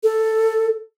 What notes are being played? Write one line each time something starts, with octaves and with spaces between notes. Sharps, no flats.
A4